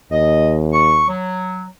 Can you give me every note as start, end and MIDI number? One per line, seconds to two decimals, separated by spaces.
0.12 1.14 39
0.12 0.54 75
0.73 1.05 85
1.08 1.65 54